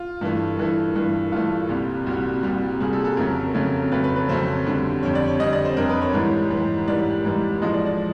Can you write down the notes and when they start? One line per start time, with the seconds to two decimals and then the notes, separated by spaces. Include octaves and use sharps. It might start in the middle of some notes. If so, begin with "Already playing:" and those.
Already playing: F4
0.21 G2 E3 A3
0.58 G2 E3 A3
0.95 G2 E3 A3
1.32 G2 E3 A3 F4
1.69 C2 A#2 G3
2.06 C2 A#2 G3 F#4
2.43 C2 A#2 G3
2.80 C2 A#2 G3 G#4
2.93 A4
3.00 G#4
3.05 A4
3.17 F2 C#3 F#3 A3 A#4
3.54 F2 C#3 F#3 A3
3.92 F2 C#3 F#3 A3 B4
4.04 B4
4.16 B4
4.29 F2 C#3 F#3 A3 C5
4.66 F2 D3 G3
5.03 F2 D3 G3 C#5
5.15 D5
5.28 C#5
5.40 F2 D3 G3 D#5
5.53 D5
5.65 C5
5.77 F2 D3 G3 A#4
5.89 B4
6.02 C#5
6.13 G#2 E3 G3
6.51 G#2 E3 G3
6.88 G#2 E3 G3 D5
7.25 G#2 E3 G3
7.61 A2 F3 G#3 D#5
7.74 D5
7.86 D5